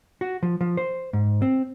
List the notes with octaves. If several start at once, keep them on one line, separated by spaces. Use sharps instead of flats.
F#4
F3
F3
C5
G#2
C4